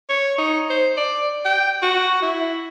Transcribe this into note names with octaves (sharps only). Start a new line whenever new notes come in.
C#5
D#4
C5
D5
G5
F#4
E4